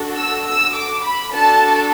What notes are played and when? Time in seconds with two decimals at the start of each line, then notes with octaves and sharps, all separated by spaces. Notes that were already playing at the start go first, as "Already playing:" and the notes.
Already playing: D4 F#4 A4
0.17 E6
0.46 E6
0.74 D6
1.04 B5
1.33 D4 F#4 A4 A5